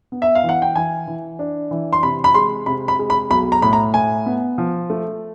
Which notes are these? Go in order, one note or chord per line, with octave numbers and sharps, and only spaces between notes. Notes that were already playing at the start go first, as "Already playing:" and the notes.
B3
E5
F5
E3
F#5
G5
E3 G#5
E3
D4
E3
C6
C3 B5
B5
G#3 C6
C3 B5
B5
G#3
B5
B1 B5
A#5
A2 B5
A#5
A2 G#5
B3
F3
A3